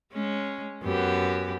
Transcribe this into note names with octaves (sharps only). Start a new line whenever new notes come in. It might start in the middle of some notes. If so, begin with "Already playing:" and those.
G#3 C#4
F#2 B3 G4